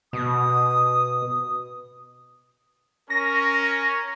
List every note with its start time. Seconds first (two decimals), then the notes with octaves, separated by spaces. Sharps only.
0.13 B2 D#6
3.10 C#4 A#4 A#6